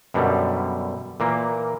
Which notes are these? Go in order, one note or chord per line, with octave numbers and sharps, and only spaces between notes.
F#2 B2 D3 G3
A#2 E3 A#3